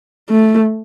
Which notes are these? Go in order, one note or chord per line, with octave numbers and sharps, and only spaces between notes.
A3